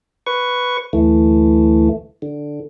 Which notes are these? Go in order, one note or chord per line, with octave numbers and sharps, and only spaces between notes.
B4 C#6
D2 E3 A3
D3